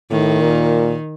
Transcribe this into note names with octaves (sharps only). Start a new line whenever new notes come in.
A2 D#3
A#2